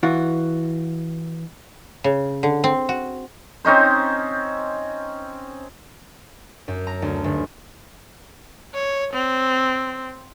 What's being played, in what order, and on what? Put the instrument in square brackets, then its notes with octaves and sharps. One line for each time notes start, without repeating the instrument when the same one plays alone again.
[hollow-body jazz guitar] E3 F4 F#4
[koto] C#3
D3
C4
F#4
[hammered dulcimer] C4 C#4 D#4 C5
[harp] F#2
A#5
D2
G1
[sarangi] C#5
C4